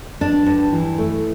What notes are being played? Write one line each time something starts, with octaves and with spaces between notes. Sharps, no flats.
G2 D4
G2
E3
A3